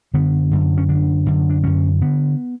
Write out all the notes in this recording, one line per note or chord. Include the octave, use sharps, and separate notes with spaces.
F#2 D3 B3
F#2 D3
C#4
F#2 D3 D4
F#2 D3
D4
F#2 D3 C#4
D3 B3